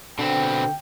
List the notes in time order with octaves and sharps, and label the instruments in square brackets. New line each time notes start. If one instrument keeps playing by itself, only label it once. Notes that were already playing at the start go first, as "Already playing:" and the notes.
[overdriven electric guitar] B2 C4 [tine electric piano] D3 [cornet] G5